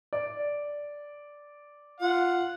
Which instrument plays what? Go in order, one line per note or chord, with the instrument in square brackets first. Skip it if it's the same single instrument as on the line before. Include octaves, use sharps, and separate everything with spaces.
[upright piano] D5
[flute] F4 [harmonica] F#5